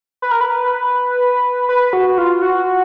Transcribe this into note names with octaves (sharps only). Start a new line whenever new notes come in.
B4
A#4
B4
B4
F#4
F4
F#4